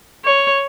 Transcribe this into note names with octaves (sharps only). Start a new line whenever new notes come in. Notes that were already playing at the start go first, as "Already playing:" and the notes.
C#5